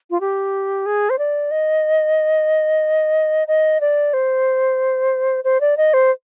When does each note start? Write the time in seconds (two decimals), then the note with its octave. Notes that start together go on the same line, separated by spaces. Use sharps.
0.10 F4
0.21 G4
0.86 G#4
1.10 C5
1.18 D5
1.51 D#5
3.48 D#5
3.81 D5
4.13 C5
5.44 C5
5.61 D5
5.77 D#5
5.94 C5